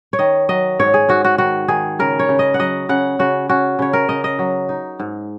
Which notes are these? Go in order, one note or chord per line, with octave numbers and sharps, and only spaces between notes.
C#5
D#3 D#5
F#3 D#5
G#2 C#5
G#4
G#2 F#4
F#4
D#3 F#4
D#3 G#4
C#3 A#4
C#5
C#3
D#5
F#5
F#3 D#5
C#3 F#5
C#3 F#4
C#4 F#4
C#3 C#5
A#4
C#3 D#5
D#5
F#3
D#4
G#2